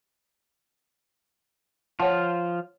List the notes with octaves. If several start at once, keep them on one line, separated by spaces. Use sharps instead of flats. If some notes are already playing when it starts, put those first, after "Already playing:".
F3 F4 C#5 F#5 A5